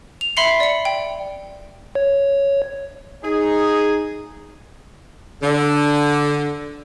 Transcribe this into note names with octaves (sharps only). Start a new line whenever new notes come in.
F7
E5 B5 C6 C7 C#7
D5 C#7
G5
C#5
D#4 G#4
D3